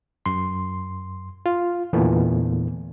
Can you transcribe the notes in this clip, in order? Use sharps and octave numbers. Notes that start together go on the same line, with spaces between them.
F#2 C6
F4
E2 A#2 D3 E3 A3 B3